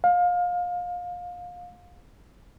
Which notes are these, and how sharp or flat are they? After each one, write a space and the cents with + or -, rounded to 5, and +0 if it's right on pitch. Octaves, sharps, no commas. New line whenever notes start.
F5 +25